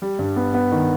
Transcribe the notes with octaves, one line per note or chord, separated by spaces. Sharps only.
G3
G2
B3
B3
D#3